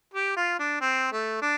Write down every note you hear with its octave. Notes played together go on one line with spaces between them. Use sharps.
G4
F4
D4
C4
A3
D4